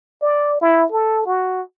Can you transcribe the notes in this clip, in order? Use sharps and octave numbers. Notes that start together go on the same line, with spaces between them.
D5
E4
A4
F#4